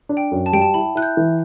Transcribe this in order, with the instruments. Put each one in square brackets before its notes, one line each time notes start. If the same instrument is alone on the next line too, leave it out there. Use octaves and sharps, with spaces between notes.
[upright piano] D4
[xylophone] G5
[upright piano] F#2
[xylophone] A5
[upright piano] G3 [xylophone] G5
[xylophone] A5
[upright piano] E4 [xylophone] B5
[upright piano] E4 [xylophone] F#6
[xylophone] G6
[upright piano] E3